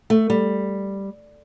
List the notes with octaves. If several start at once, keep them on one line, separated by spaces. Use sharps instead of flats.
A3
G3